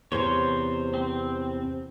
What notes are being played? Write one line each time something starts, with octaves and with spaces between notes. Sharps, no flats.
E2 C3 C5 C#5
C4